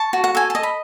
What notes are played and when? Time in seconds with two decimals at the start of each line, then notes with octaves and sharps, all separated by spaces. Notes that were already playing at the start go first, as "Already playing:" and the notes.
Already playing: A5 C#6
0.13 F#4
0.24 F#5
0.35 A4 G#5
0.50 D#5 A5
0.63 B5